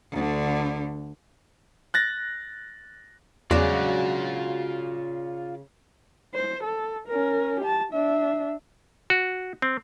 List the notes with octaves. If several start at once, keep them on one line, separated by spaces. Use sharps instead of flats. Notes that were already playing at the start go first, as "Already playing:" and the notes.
D2 D3
F#6 A6 A#6
E2 C#3 F#3 G#3 D4 F4 D5
C5
A4
C#4 A#4
G4 A5
D4 E5
F#4
C4